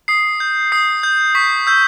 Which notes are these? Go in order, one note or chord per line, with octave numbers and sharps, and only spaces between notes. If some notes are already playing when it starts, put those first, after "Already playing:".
D#6 C7
G6
D#6 C7
G6
C#6 B6
E6 G6